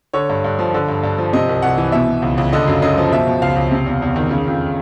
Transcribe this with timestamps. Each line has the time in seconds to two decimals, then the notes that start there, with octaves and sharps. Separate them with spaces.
0.13 D3 C#5
0.29 G2
0.44 G2
0.59 F3
0.74 D3
0.88 G2
1.03 G2
1.18 F3
1.33 C3 D#5
1.49 C2
1.62 C2 F#5
1.78 E3
1.92 B2 E5
2.08 B2
2.22 C#2
2.38 C#2
2.53 D3 D#5
2.67 F#2
2.82 F#2 D#5
2.97 F3
3.12 B2 E5
3.27 B2
3.42 C#2 F5
3.56 C#2
3.71 C3
3.86 E2
4.02 E2
4.16 D#3
4.31 C#3
4.47 F2